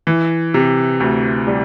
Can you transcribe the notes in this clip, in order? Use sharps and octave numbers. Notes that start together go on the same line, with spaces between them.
E3
C3
D2
G3